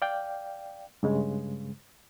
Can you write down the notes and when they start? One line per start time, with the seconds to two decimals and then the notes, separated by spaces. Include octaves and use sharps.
0.02 D5 F5 G5
1.03 G2 C#3 G#3